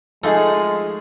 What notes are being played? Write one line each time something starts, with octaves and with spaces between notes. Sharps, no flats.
F3 G#3 A3 D#4 G#4 D#5